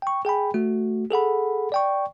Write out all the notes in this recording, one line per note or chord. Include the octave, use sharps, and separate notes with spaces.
G5 C#6
G#4 G5 G#5 B5
A3 F#4
G#4 A4 F#5 B5
D5 G5 C#6